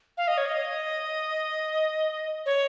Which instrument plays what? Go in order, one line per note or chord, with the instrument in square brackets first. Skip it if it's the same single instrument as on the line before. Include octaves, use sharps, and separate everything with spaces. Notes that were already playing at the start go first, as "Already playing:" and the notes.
[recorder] F5
D#5
C#5
D#5
C#5